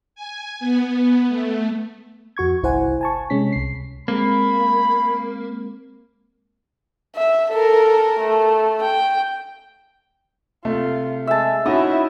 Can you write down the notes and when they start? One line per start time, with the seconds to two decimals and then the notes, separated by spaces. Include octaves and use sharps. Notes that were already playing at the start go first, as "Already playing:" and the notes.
0.15 G#5
0.60 B3
1.28 A3
2.37 F2 F#4 C#6 G#6
2.62 G1 C2 E4 C5 F#5 G#5
3.01 G#5 A5 C#6
3.30 C3 G#3 C#4 B6
3.53 C2 C7
4.08 G#3 A#3 C4 B5
7.16 E5
7.51 A4 A#4
8.20 A3
8.81 G5
10.65 C3 A3 F4
11.27 G#3 E5 A5
11.66 C#4 D#4 E4 F#4 D#6